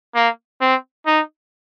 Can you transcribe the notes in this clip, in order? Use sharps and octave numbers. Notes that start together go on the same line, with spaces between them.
A#3
C4
D#4